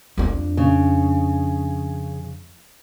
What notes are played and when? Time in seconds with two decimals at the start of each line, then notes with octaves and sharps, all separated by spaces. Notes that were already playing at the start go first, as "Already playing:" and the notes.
0.18 F2 D4
0.57 C#3